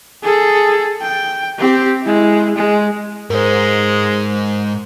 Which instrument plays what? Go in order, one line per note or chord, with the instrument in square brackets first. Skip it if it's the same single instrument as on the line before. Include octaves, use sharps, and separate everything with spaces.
[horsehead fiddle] G#4 A4
G5
C4 G4
G#3 E4
G#3
[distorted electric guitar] G#2 [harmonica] G#3 [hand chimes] A#4 C5